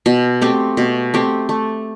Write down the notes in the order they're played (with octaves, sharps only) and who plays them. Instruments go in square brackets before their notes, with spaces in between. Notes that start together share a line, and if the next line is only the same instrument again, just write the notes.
[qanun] B2
A3 C4 G4
B2
A3 C4 G4
A3